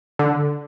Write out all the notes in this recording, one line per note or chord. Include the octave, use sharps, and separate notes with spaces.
D3